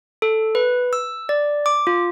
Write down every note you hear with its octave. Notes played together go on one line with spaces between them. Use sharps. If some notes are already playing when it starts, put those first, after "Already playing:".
A4
B4
E6
D5
D6
F4